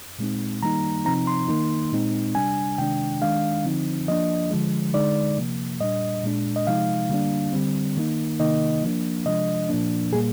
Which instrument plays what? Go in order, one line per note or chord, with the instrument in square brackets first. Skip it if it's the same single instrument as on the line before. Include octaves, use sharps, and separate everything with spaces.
[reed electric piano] A#2 G#3 C4 D#4
D#3 G3 A#3 D#4 A#5
C3 F3 C4 D#4 A#5
C6
D#3 A#3 D#4
A#2 G#3 C4 D#4
C3 G3 D4 G#5
C3 D#3 G#3 D4 G5
D#3 G#3 D4 F5
D3 F3 C4 D#4
F3 A#3 D4 D#5
D3 F3 G#3
D3 G#3 D#4 D5
C3 F3 A#3
A#2 G3 D4 D#5
A#2 G#3 D4
D#5
C3 F3 G#3 D#4 F5
D3 G3 A#3 D4
D3 G3 C4
D#3 A#3 D#4
C3 D#3 A#3 D#4 D#5
F3 A#3 D4
C3 F3 G#3 D4 D#5
A#2 F3 A#3 D4
A#2 G3 A#3 G#4